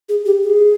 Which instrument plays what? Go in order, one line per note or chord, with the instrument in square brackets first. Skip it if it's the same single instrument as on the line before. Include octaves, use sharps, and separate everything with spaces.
[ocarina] G#4
G4
G#4